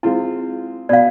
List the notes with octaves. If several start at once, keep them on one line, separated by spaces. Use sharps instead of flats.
G#3 C4 E4 F4
B2 D5 F5